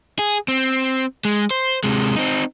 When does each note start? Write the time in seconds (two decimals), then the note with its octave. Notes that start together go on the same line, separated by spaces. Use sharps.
0.19 G#4
0.48 C4
1.25 G#3
1.51 C5
1.84 C3 G#3
2.16 C4 D#4